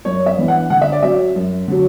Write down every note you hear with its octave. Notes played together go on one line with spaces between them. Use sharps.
F#2 C#5
E5
E3 B3 D4
F#5
D3 F#5
E5
D5
F#3 C#4 E5
F#2
D3 F#3